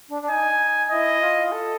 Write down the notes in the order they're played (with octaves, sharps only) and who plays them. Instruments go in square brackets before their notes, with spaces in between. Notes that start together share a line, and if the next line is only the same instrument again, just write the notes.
[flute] D4
D4
[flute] D#4 [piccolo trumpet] G#5
[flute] E4 [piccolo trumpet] D#5
[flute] F4
A4